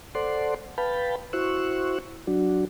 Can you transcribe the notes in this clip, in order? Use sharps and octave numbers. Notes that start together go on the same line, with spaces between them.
A4 C5 D5 F#5 C6
B4 F5 G5 A5 B5
E4 F#4 C5 C#6 E6 F#6
F#3 D4 F#4